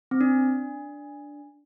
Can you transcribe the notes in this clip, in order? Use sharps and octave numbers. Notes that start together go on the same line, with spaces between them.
C4
D4